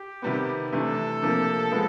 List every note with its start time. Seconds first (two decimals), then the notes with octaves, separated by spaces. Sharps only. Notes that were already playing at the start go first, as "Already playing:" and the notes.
Already playing: G4
0.22 C3 D#3 G3 B3
0.72 C3 E3 A3 D4 A4
1.22 C3 F3 A#3 D4
1.71 F3 G#3 B3